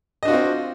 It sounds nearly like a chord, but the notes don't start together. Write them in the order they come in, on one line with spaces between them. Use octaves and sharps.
D#5 D4 F#4 F4 C4